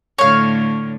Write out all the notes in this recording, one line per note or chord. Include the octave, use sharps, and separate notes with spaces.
A2 D3 C#5 F5